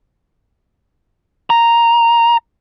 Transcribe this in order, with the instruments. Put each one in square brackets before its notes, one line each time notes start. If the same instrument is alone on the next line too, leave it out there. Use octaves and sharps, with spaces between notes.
[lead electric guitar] A#5